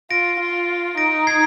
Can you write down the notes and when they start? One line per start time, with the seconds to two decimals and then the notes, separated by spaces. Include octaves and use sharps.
0.10 F4 A#6 D7
0.40 F4
0.97 D#4 A#6 D7
1.27 G#6 C7